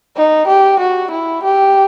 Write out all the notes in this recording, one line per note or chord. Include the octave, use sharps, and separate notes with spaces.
D#4
G4
F#4
E4
G4